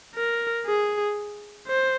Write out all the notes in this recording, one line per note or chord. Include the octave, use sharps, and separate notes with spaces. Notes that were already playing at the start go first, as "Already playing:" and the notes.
A#4
G#4
C5